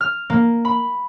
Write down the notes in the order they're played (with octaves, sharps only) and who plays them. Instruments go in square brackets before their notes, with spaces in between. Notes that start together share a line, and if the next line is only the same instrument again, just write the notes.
[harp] F6
A#3
B5